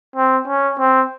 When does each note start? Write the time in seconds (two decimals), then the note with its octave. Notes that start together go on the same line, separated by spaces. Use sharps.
0.16 C4
0.47 C#4
0.80 C4